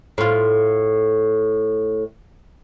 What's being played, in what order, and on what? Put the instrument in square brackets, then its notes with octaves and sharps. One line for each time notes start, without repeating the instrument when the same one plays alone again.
[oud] A2 F4